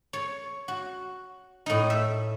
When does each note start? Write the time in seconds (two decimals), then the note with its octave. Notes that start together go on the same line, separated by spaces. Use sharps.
0.13 C#5
0.68 F#4
1.66 A2 D#4
1.90 E5